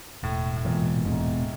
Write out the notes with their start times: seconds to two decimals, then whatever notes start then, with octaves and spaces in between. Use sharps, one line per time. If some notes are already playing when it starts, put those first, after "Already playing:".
0.23 E1 A2
0.56 A2
0.65 E1 A#2
1.05 E1 G#2